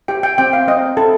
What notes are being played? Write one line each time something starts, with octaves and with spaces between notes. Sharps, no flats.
G4 G5
G5
C4 G5
F5
C4 D#5
C4 A4